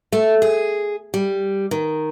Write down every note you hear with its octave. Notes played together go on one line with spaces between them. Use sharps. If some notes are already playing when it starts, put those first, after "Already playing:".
A3
G#4
G3
D#3